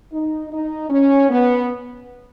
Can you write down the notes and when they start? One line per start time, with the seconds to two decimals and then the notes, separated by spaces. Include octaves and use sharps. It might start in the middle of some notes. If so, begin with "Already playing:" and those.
0.12 D#4
0.51 D#4
0.90 C#4
1.29 B3